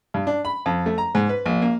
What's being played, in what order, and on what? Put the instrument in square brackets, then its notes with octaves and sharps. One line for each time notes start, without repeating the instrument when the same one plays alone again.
[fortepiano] G2
D4
B5
F2
A3
A#5
G#2
B4
A#1
A#3